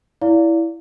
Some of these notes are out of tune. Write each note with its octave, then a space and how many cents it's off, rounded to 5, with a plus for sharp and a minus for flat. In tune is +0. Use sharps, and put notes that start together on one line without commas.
E4 +0 D5 -25 F5 +0